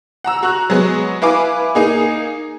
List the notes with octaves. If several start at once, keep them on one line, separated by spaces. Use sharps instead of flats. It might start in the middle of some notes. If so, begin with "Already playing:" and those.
F#5 A#5 E6
F#4 A#5 C#6 F#6
F#3 G#3 B3
E4 B4 F5 G#5 D6
A#3 D#4 G#4